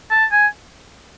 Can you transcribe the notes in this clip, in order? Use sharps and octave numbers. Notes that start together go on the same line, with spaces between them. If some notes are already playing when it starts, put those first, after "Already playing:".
A5
G#5